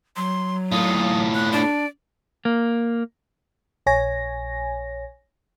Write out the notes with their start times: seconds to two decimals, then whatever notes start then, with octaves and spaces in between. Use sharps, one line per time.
0.16 F#3 C6
0.72 A2 F4 D#6
1.34 F#6
1.53 D4 D5
2.45 A#3
3.86 A#1 C#5 G#5 A#6